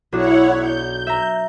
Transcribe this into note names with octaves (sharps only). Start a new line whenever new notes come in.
B1 D4 E4 F#4 C#5 F#5
G6
E5 A#5